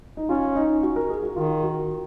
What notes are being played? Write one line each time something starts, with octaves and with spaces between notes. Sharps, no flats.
D#4
C#4 F4
D#4
F#4
A#4
G#4
F#4
D#3 F4
F#4